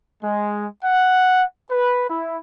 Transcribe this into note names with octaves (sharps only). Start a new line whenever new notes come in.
G#3
F#5
B4
E4